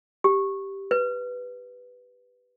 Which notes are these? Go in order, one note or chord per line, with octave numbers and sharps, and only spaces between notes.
G4
B4